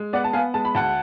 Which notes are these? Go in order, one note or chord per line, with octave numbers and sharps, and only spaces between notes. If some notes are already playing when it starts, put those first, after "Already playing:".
Already playing: G#3
B3 D5 F#5
A5
B3 F5 G#5
G#3 A5
B5
D2 F#5 A5